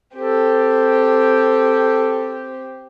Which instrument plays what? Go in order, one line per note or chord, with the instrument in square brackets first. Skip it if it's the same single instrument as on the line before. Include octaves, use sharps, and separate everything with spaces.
[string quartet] C4 G4 [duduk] A4